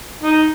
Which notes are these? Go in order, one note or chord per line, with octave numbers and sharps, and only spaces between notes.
D#4